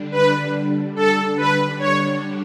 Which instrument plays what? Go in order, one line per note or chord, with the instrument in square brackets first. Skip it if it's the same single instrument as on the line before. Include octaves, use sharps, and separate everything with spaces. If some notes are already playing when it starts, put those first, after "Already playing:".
Already playing: [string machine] D3 G3 D4
[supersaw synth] B4
A4
B4
C#5